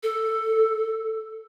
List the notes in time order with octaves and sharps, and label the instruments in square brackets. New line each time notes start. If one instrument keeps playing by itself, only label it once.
[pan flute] A4